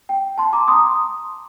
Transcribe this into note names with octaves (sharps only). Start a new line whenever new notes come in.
G5
A5 C6
A#5 D6
C6 D#6